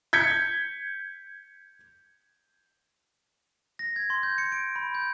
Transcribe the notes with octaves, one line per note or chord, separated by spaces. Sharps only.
G6 G#6 B6 C#7
A#6
G#6
C6
G6
C#7
D7
B5
G6